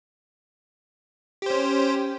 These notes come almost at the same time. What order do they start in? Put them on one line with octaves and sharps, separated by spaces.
G4 C5 C#4